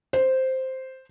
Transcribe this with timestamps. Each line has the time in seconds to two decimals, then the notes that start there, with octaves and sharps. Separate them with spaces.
0.13 C5